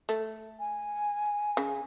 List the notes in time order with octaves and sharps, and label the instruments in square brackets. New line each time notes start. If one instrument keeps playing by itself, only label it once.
[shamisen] A3
[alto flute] G#5
[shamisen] C#3